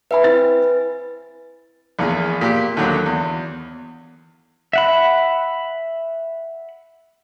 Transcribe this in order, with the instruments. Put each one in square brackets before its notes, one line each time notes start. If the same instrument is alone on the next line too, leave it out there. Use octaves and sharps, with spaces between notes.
[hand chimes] B4 G#5 [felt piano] E5 B5
[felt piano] C4 E4 A6
[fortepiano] A#1 E2 G#4
A#2 G4
D#2 D3 F#3
E2
[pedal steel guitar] E5 F#5 B5